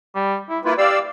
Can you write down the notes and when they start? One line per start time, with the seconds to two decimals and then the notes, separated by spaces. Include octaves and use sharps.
0.15 G3
0.50 E4
0.65 A#3 E4 F4 B4
0.78 G4 D5 F5 E6